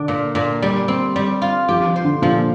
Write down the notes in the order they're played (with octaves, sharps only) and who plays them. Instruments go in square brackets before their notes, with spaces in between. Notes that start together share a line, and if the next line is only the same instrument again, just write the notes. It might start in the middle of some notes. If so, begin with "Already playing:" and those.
Already playing: [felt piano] D3 [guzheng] D4
[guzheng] A#2
A#2
G3
C4
G3
F4
[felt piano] F3 [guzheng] G4
[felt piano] F3
[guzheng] C5
[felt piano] D3
[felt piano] A#2 [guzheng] F3